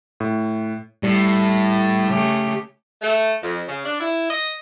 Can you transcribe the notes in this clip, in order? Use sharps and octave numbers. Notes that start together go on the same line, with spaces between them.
A2
A2 G3
C#3 A3 G4
A3
F2
C#3
D4
E4
D#5